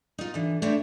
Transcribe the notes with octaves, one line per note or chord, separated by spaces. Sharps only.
D#4 F4
D3 E3
A3 C4 D4 E4 C#5 E5